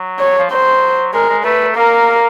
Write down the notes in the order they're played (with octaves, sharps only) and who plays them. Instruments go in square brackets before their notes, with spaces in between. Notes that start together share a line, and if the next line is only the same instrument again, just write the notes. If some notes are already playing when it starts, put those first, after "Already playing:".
Already playing: [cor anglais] F#3
[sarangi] C#5
[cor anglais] F3
[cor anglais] F#3 [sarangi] C5
[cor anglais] G#3 [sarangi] A#4
[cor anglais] G#3
[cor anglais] A3 [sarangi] B4
[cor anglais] A#3 [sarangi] A#4